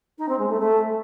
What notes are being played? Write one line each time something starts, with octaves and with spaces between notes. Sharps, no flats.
D#4
C4
G#3
A3
A3